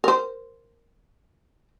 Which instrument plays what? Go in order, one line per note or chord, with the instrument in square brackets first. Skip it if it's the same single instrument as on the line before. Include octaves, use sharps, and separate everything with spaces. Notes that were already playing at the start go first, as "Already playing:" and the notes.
[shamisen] A#4 C5